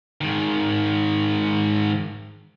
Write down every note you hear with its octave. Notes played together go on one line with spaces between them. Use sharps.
G#2 D#3